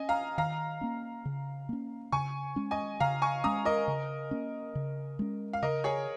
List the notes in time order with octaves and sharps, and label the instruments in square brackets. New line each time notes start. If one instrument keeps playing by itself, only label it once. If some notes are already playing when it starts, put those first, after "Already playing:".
Already playing: [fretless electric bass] C#4 [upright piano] D#5 G#5
[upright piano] F5 A#5
[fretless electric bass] D#3 [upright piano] F5 A#5
[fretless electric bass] A#3 C#4
C#3
A#3 C#4
[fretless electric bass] C#3 [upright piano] G#5 C#6
[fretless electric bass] G#3 C#4
[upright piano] D#5 G#5
[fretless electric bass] C#3 [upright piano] F5 A#5
[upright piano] G#5 C#6
[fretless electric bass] G#3 C#4 [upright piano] A#5 D#6
[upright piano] A#4 D#5
[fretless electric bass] C#3
A#3 C#4
C#3
G#3 C#4
[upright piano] F5
[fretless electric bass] C#3 [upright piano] A#4 D#5
[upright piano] G#4 C#5